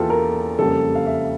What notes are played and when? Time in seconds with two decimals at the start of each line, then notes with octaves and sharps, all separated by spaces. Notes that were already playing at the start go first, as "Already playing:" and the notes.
Already playing: E2 E3 A#3 F4 G4 A4
0.10 A#4
0.59 F2 C#3 G3 A#3 A4
0.95 F5
1.06 E5